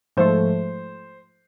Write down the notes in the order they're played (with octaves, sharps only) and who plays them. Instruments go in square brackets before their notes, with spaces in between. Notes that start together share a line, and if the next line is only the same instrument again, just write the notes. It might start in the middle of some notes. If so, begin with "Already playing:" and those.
[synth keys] G#2 F3 A3 [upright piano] C5